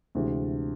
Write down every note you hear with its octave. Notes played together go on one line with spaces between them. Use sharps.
D2 C3 E3 G#3